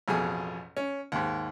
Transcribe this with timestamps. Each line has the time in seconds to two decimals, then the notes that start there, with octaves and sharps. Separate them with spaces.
0.08 A1 F2 B2 G#4 G#5
0.77 C#4
1.12 D#2 G#2